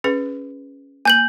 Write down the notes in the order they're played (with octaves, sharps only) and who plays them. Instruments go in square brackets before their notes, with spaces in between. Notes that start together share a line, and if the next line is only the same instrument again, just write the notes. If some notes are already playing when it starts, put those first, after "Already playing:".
[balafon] C#4 G#4 B4
[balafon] A#3 [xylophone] G#5 G6 F#7